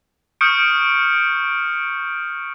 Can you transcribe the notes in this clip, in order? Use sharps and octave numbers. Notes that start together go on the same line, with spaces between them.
C#6 D#6 F6 G6 C#7 D7